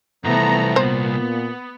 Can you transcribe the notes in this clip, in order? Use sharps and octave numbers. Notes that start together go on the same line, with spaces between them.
C2 G#2 E3 F3 A3 B3 A#5
A#2 B3 C5